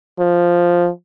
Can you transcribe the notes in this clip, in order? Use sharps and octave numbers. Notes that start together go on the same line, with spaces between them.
F3